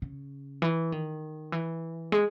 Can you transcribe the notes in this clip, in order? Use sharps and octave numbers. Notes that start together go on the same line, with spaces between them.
C#3
E3
D#3
E3
G#3